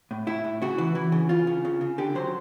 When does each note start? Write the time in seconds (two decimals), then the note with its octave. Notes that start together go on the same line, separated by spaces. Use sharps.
0.11 A2
0.27 A2 E4
0.44 A2
0.62 C#3 F#4
0.78 E3
0.95 E3
1.12 C#3
1.29 C#3 F4
1.47 C#3
1.65 C#3
1.81 C#3
1.98 D3 G4
2.15 F#3 C5